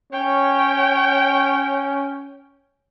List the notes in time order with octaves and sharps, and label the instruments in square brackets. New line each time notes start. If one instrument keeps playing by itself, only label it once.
[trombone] C#4 [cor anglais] C#5 [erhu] G5